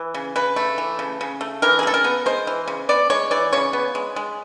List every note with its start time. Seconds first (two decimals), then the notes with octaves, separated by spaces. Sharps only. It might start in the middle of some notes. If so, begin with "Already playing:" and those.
Already playing: E3
0.14 C#3
0.36 C#3 B4
0.56 A3
0.78 E3
0.99 C#3
1.21 C#3
1.41 A3
1.62 E3 A#4
1.79 G#4
1.83 C#3 A4
1.94 A#4
2.04 B3
2.26 G#3 C5
2.47 E3
2.68 C#3
2.89 B3 D5
3.10 G#3 C#5
3.31 E3 D5
3.53 C#3 C#5
3.73 B3
3.95 G#3
4.16 G#3